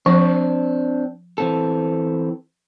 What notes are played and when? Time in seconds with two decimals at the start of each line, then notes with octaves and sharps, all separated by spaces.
0.06 F3 C4 D4
1.38 E3 C4 A4